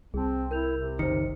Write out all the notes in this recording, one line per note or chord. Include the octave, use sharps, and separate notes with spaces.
C2 C4 G#4 A5
E4 A#4 G6 F7
C3
F#1 D#3 C5 C#7